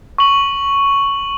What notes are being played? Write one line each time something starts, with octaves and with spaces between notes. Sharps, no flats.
C#6 F#7